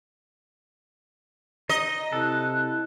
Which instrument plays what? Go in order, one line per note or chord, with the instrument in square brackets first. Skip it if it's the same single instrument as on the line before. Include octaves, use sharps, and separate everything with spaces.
[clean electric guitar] D#4 [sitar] D#5
[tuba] C3 [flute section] E4 F#6 [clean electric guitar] A4